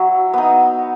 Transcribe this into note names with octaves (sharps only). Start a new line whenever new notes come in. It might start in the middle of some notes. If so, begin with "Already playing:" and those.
Already playing: F#3 E4
B3 D#4